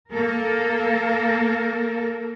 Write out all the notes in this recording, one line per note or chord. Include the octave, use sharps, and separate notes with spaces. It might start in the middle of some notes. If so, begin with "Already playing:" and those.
A#3 A4 A#4